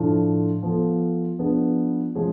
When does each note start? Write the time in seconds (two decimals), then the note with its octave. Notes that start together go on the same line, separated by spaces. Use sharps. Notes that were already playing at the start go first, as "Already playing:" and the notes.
Already playing: A2 F3 A3 D4 F4
0.63 F3 B3 F4 A4
1.39 F3 B3 D4 G#4 B4
2.15 F3 G#3 C#4 G#4